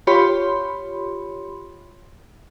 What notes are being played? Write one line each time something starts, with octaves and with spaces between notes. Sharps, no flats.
F4 G4 C#5 B5 C6